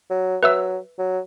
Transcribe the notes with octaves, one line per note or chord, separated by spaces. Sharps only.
F#3
F#3 B4 E5 E6
F#3